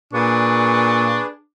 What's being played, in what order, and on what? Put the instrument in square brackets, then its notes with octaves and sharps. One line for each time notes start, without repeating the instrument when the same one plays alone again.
[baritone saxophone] A#2 [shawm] D4 [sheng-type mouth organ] G#4 B4 [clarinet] C#6